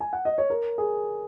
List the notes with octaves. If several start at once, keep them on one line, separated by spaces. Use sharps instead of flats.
G#5
F#5
D#5
C#5
A#4
G#4